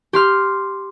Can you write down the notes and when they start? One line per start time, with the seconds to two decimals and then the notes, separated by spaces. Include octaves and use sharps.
0.13 G4 C6 F6